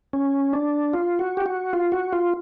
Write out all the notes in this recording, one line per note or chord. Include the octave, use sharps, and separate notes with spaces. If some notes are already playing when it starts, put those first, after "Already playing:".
C#4
D4
F4
F#4
G4
F#4
F4
F#4
F4